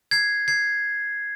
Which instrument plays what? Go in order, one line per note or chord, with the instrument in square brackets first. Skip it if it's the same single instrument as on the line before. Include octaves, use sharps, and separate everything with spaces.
[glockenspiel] G#6 C7
G#6 C7